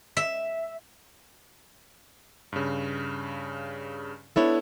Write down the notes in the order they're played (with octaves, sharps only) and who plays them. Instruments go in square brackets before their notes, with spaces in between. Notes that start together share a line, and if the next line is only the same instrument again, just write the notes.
[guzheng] E5
[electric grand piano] G2 C#3
[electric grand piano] B3 A4 [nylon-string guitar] D4 E4 C#5